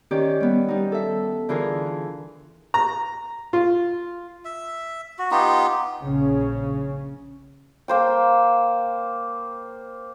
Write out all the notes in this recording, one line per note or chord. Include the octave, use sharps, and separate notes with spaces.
D#3 C#4 G4 D5
G3 B3
G3 D#4
A4 E5
D3 E3 F4 G#4 A#4
A#5
F4
E5
F#4
B3 D#4 F4 G4
A#1 C#3 C#4
A#3 C5 G5